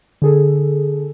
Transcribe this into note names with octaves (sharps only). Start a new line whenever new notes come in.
D3 G#4 A4